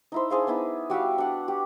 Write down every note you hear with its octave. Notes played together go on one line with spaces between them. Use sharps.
D#4 E4 C5
D4 G#4 C5 F5
B3 D#4 E4
G3 F#4 E5 F5
D4 F#5
G4